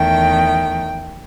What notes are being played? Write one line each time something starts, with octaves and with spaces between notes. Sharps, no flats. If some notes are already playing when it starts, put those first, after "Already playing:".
Already playing: E2 D#3 A3 G5